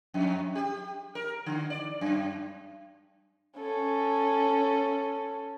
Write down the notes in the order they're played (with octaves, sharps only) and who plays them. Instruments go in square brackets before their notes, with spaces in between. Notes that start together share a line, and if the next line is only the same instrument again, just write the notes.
[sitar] F2
G4
A#4
D3
D5
F#2
[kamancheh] C#4 A4